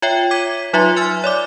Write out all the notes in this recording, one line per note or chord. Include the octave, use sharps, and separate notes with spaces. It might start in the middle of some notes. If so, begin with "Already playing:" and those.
F4 C#5 E5 G5
D6 G#6 B6 D#7
F#3 D#4 F4 E5 C6
G#5 C6 E6 F6 A6
C#5 D5 D6